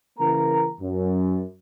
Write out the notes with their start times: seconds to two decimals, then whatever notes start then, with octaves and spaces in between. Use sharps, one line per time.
0.19 C#3 E3 A#3 A#4 A#5
0.80 F#2